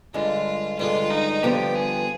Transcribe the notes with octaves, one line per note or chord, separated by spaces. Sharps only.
G2 D3 G#3 F4
G2 D3 G#3 F4
D#4
G2 D3 F3 B3 G4
G#4